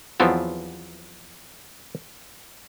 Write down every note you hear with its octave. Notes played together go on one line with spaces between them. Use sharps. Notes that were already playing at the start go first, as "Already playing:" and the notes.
E2 F3 F#3 B3 C4